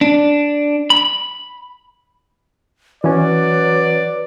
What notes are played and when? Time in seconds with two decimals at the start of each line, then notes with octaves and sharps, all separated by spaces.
0.01 D4
0.90 B5
3.04 E3 F#3 C#4 B4 D5